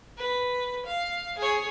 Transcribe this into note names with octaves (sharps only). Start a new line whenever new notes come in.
B4
F5
G#4 C#5